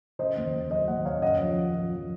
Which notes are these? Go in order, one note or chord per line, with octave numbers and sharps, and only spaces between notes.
C#3 C5 D#5
D#2
D#2
F#3 C5 D#5
D#2 D#5 F#5
C#3 C#5 F5
F#2 D#5 F#5
F3
F3
F3
F3